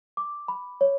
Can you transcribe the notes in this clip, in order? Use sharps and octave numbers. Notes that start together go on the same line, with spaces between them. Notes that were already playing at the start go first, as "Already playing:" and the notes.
D6
B5
C#5